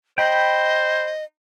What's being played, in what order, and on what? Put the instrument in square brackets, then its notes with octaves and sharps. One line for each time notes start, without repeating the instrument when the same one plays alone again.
[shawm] C5 [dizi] D#5 [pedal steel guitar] G5 B5